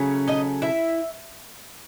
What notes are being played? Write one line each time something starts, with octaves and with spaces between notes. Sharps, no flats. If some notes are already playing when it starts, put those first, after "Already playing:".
Already playing: C#3 F#3 A3 C#4
D#4 D#5
E4 E5